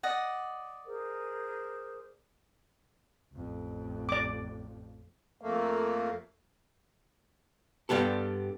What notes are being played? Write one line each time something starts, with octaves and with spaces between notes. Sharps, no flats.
D5 D#5 F#5
G#4 A#4 C5
A1 F2
D5 D6
F2 A3 A#3
G2 G3 B3 G4 A4